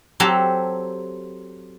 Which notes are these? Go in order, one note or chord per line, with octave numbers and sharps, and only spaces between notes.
F#3 C4 G4 A4 A#5